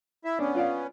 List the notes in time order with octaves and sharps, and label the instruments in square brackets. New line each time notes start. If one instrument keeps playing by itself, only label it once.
[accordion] E4 E5
[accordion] B3 C#4 [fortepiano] D4
[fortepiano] F4 D5 F5